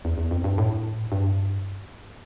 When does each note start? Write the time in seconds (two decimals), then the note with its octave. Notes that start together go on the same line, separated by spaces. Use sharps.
0.05 E2
0.18 E2
0.31 F2
0.44 G2
0.58 A2
1.12 G2